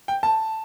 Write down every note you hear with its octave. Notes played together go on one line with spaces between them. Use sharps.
G5
A5